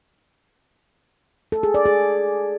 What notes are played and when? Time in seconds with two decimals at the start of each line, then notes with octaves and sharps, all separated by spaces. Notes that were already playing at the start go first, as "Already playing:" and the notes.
1.52 A4
1.63 G#4
1.74 D5
1.85 G#4